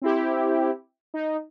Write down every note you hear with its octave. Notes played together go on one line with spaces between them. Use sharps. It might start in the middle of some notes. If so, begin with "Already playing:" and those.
C4 E4 G4
D#4